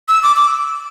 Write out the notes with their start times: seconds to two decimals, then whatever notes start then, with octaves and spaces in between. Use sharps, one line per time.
0.09 E6
0.23 D6
0.36 D6